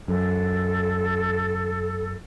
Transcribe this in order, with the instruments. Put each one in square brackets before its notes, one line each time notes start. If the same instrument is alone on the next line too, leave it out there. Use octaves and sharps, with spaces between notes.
[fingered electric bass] F#2 [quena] A4